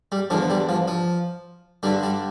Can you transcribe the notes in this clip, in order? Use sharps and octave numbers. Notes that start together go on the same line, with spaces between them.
G3
E2 D3 F3
G3
F3
F3
G2 D3 G3
G3